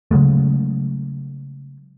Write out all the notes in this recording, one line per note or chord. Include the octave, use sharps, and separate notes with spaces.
C#3 F#3 G#3 A3